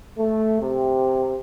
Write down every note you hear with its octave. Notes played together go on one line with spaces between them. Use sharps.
A3
C3